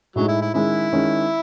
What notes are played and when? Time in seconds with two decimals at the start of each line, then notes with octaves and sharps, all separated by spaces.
0.16 A2 F#3 G#3 D#4
0.28 E4
0.42 E4
0.54 D#3 G#3 C#4 E4
0.93 D#3 G#3 C#4